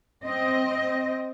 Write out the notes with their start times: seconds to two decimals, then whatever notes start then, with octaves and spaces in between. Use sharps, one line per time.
0.24 C4 D#5